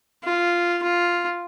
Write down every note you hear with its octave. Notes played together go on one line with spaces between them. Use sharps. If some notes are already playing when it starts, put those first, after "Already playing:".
F4
F4